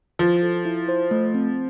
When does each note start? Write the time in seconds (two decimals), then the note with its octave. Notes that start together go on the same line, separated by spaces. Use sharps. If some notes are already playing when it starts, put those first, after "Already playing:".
0.19 F3 E4
0.42 A4
0.65 E4
0.89 C5
1.11 A3
1.34 C4